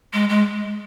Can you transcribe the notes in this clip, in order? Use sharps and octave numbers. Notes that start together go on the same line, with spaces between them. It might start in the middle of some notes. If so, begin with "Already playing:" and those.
G#3
G#3